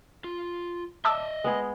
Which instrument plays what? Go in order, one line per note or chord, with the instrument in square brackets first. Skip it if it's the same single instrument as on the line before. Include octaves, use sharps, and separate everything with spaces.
[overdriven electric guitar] F4
[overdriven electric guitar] D#5 E5 [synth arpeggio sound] A5 D6 E6
[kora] G#3 B3 G#4